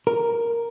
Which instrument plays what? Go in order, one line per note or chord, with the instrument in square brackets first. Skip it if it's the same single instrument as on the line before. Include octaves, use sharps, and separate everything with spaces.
[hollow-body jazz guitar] A#4